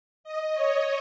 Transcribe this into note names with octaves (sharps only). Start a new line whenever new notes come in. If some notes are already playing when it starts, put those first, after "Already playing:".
D#5
C#5